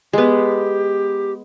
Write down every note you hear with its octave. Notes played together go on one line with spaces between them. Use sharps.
G#3 B3 G4